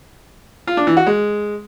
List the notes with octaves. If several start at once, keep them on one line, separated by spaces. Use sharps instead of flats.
F4
D4
E3
F#4
G#3